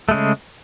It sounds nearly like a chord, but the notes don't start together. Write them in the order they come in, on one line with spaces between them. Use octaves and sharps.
A3 G#3 C#3